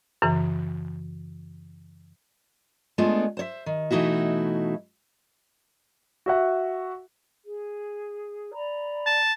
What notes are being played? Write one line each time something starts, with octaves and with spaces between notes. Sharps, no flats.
F#2 C#3 E3
G#3 A3 B3 D4 F4
C5 C#5 E5
D#3
B2 E3 A3 D#4 E4 F#4
F#4 E5 F#5
G#4
D5 A#5 B5
A5